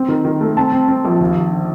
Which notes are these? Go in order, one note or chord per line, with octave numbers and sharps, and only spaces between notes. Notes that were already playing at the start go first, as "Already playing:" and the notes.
Already playing: C4
D#3
D#3
A3
C4 A5
C4
C4
A#1
D#2
D#2
D3